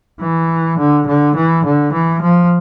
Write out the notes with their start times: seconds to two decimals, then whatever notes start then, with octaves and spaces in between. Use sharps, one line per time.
0.21 E3
0.78 D3
1.07 D3
1.36 E3
1.64 D3
1.92 E3
2.21 F3